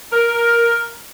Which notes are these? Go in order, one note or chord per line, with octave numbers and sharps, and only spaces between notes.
A#4